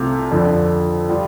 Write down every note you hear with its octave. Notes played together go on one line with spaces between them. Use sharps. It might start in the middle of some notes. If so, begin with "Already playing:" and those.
Already playing: C2 C3 A3 C4 F4
F2 D3 F3
G3 F4